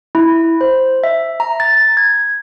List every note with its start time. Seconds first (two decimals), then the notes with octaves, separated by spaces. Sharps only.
0.15 E4
0.61 C5
1.04 E5
1.40 A#5
1.60 A6
1.97 G#6